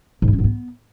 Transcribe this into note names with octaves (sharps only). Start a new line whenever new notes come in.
G#2
G#3
C#4
G#2
B3